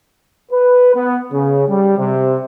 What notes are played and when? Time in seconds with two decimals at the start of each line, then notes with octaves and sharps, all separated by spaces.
0.52 B4
0.95 B3
1.32 C#3
1.68 G3
1.98 C3